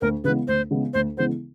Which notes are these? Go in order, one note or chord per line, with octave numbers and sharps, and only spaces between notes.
D2 A#4
C#3 E3 G#3 B3 B4
D2 C5
C#3 E3 G#3 B3
D2 C5
C#3 E3 G#3 B3 C5